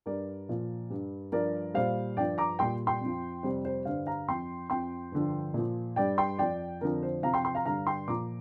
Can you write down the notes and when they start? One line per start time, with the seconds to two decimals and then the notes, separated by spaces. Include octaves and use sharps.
0.06 G2 G3 A#4 D5
0.49 A#2 F3
0.90 G2 G3
1.32 G2 F3 A#4 D5
1.74 A#2 G3 C5 F5
2.17 G2 F3 D5 G5
2.38 A#5 D6
2.59 A#2 G3 G5 C6
2.87 G5 C6
3.01 F2
3.06 F3
3.43 F2 C3 G3 C5
3.65 C5
3.85 G2 D3 G3 C5 F5
4.07 F5 A#5
4.28 F2 F3 G5 C6
4.70 F2 F3 G5 C6
5.12 G2 D3 F3
5.54 A#2 F3
5.96 G2 G3 D5 G5
6.18 G5 C6
6.38 F2 F3 D5 G5
6.81 F2 D3 F3 A#4
7.03 C5
7.23 F2 C3 F3 F5 A#5
7.34 G5 C6
7.44 G5 C6
7.55 F5 A#5
7.65 G2 D3 G3 F5 A#5
7.87 G5 C6
8.08 A#2 F3 A#5 D6